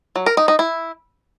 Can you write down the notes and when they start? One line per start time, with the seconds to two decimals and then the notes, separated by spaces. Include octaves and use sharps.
0.16 F#3
0.26 A#4
0.37 D#4
0.48 D#4
0.59 E4